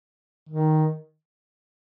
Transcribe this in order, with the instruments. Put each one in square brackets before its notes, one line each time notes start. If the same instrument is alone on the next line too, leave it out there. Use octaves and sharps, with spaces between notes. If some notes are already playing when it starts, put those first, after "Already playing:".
[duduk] D#3